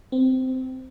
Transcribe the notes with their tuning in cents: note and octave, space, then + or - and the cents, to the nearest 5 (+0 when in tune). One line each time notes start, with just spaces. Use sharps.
C4 -15